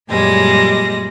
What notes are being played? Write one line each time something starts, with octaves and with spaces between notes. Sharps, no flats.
F#2 A#2 G3 G#3 A#6